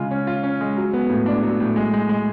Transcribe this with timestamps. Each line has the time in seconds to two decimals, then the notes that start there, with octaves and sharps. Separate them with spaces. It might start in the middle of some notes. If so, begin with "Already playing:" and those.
Already playing: C#3 G#3 F4
0.11 C#4
0.27 F4
0.43 C#4
0.61 G#3
0.77 F#3
0.93 B3
1.10 A2
1.26 D4
1.43 F#3
1.60 A2
1.76 G#3
1.94 G#3
2.09 G#3